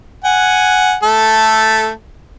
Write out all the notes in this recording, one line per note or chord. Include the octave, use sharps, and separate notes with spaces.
F#5 G#5
A3 A4